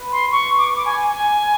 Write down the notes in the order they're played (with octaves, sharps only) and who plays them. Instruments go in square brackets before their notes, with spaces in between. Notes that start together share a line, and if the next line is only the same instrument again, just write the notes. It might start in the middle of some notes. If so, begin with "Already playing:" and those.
Already playing: [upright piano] B4
[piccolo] C6
C#6
D6
C#6
D6
G#5
G#5